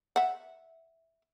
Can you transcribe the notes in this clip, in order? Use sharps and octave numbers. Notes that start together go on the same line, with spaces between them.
E5 F#5